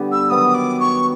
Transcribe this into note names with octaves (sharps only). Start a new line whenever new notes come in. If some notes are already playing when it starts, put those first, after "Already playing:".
Already playing: D3 G3 B3
E6
D#3 F#3 B3 D#6
D6
C#6